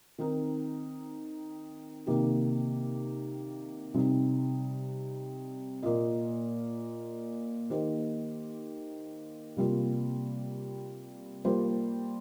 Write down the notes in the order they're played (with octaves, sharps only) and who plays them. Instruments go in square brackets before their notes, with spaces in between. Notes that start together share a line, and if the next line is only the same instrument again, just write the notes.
[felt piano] D#3 C4 D#4 A#4
C3 D#3 A#3 G4
C3 G3 C4 D#4
A#2 A#3 F4 D#5
D#3 A#3 G4 C5 D#5
C3 G3 A#3 F4
G3 A#3 F4 C5